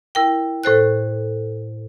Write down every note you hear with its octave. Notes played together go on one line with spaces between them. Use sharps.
E4 A#4 G5
A2 A4 C5 F#6